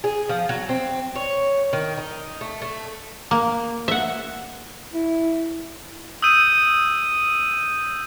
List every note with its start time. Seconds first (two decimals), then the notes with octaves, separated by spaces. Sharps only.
0.04 G#4
0.29 F3
0.49 F#3
0.69 C4
1.15 C#5
1.73 D#3
1.98 D#4
2.41 A3
2.62 A3
3.31 A#3
3.88 E5 F#5
4.94 E4
6.22 D#6 E6 G6 D#7